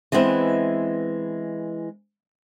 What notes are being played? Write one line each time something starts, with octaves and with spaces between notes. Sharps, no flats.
E3 G#3 B3 C4 E4